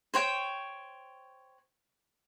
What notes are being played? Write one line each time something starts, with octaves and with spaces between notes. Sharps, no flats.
C5 C#5 G5